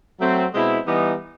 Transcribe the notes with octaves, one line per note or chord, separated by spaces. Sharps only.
F#3 A3 C4
B2 G#3 C4 E4
E3 G3 B3 D#4